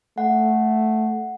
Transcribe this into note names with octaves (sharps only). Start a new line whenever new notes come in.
A3 F#5